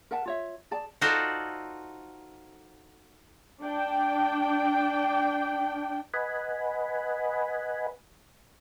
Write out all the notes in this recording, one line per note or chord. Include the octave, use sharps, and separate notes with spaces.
A#4 E5 F#5 A5
F4 C#5 E5
G#4 D5 A5
D#4 F4 F#4 A4 C5 D5
D4 G5
B4 D#5 F#5 G#5 B5